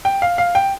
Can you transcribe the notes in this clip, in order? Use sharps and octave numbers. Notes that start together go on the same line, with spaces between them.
G5
F5
F5
G5